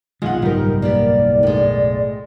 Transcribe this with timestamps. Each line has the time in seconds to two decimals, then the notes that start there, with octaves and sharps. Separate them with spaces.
0.22 C2 B2 D#3 G#3 F4 F#5
0.42 F#1 B1 G#2 B2 G3 D#4 G4 A#4
0.82 A#3 B3 G4 D5
1.43 A2 G#3